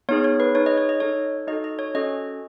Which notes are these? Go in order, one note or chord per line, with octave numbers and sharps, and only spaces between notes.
B3 D#4 G#4 C#5
C#5
B4
D#4 G#4 C#5
D#5
C#5
D#5
D#4 A4 C#5
D#4 F#4 A4 D#5
D#5
C#5
C#4 F#4 A4 D#5